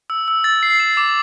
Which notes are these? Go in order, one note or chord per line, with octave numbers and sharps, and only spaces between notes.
E6
E6
A6
C7
E7
D6